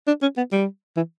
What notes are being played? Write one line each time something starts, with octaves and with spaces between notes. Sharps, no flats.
D4
C#4
B3
G3
E3